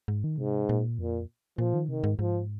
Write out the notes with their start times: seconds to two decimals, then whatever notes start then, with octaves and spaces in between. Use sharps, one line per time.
0.08 G#2
0.24 D#3
0.38 G#2 C3
0.69 A#2
0.99 F2 A#2
1.58 A#2 F3
1.74 D#3
1.89 C3 D#3
2.04 G#2
2.19 G#2 F3